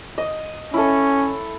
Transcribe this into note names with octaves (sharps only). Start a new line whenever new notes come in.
D#5
C#4 E4 A4